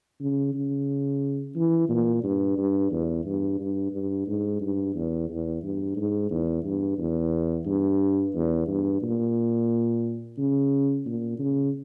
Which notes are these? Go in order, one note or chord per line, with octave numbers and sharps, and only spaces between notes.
C#3
C#3
E3
A#2
G2
G2
E2
G2
G2
G2
G#2
G2
E2
E2
G2
G#2
E2
G2
E2
G2
E2
G2
A#2
C#3
A#2
C#3